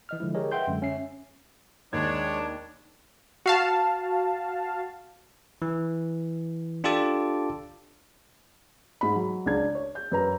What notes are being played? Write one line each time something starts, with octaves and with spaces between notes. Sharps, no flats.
E3 D#5 F6
D3 F3 G#3 E4
G4 G#4 A#4 C#5 D#5
B4 E5 F#5 G5 C6 G6
F#2 D3 G#3
C#4 E5 C7
D#2 G#3 D4 C#5 G#6
F#4 F5 A5
E3
D4 F4 G4 A4 A5 D6
G#2 B5
F#3
C#2 D4 G#6
C#5
G6
F#2 B4 A#5